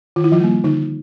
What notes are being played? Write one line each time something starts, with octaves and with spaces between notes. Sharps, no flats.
D#3 F4
E4
F3 F4
G3 A#3
D3 D#4